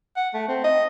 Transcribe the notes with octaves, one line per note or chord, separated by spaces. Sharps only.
F#5
A3
C4
D#5